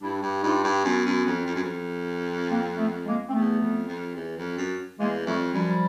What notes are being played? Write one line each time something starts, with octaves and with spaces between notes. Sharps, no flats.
G2 D4 E4
G2
G2 D#4 F4
G2
F#2 B3 C#4
F#2
F2
F2
F#2
F2
A#3 C4
A3 B3
G#3 A#3
C4
E2 A3 B3
F2
F2
E2
F2
F#2
E2 G#3 A#3
F2 G3 A3
F#2 F3 G3